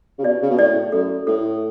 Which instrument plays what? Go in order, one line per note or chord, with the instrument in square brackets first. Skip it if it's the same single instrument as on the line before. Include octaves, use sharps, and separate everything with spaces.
[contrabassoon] C#3
[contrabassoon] B2 [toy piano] D5
[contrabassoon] C#3
B2
[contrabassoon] A2 [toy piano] D5
[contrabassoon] F#2 [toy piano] A4
[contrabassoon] A2 [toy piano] A4